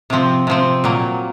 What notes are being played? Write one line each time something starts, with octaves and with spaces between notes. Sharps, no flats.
C3 F3 C4
C3 F3 C4
A#2 F#3 A#3